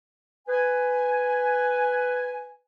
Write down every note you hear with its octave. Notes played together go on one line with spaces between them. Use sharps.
B4 G#5